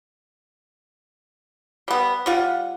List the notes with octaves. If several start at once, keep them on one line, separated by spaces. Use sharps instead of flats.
G3 B3
G3 F4 F#5